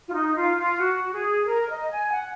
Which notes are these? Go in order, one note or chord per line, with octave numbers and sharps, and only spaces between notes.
F4
D#4
F4
F4
F#4
G#4
A#4
D#5
G#5
F#5